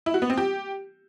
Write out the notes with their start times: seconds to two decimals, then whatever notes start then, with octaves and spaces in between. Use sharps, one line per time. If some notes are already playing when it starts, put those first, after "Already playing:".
0.06 E4
0.14 F#4
0.22 B3
0.30 C4
0.37 G4